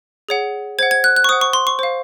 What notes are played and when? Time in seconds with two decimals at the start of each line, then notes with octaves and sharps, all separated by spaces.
0.29 G#4 C#5 F#5
0.79 C5 F#5 G#6
0.91 G#6
1.04 F#6
1.16 F#6
1.24 C#6
1.29 C5 D#6
1.32 F#5
1.41 C#6
1.53 C6
1.67 C#6
1.79 C5 F5